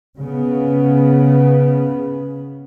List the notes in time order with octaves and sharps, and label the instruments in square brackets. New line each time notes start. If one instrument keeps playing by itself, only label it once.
[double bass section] C#3 B3